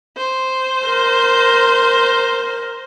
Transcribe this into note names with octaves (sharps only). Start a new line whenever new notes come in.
C5
A#4